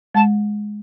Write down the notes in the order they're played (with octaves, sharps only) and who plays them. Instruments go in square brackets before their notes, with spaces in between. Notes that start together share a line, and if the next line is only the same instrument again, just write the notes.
[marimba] G#3 [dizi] A5